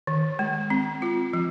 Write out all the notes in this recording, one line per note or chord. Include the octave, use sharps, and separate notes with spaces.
D#3
G#3
C4
F4
F3